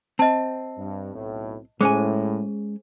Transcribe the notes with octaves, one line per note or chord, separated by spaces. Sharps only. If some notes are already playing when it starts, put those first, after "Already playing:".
C4 D#5 A5
G2
B1 A2
A2 G#3 C#4 G#4 C5 G#5